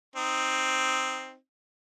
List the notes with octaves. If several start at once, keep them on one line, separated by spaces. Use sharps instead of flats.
C4 D#4